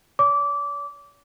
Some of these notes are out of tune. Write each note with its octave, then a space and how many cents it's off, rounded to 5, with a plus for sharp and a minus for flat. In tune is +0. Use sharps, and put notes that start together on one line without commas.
C#5 +45 D6 -20